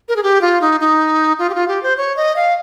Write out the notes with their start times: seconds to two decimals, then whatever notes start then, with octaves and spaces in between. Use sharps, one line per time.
0.09 A#4
0.16 G#4
0.23 G4
0.41 F4
0.61 D#4
0.80 D#4
1.39 F4
1.50 G4
1.55 F4
1.68 G4
1.83 C5
1.97 C#5
2.17 D#5
2.36 F5